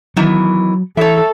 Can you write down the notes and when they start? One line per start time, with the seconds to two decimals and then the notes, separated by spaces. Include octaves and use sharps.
0.17 D#3 E3 F#3 B3
0.97 E3 A4 C#5 E5